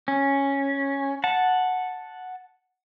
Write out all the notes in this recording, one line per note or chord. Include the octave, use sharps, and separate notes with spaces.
C#4
F#5 A5